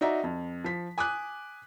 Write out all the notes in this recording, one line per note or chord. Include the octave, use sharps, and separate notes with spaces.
D#4 F#4 D5 E5 A#5
F2
F3 B6
G#5 D6 D#6 F#6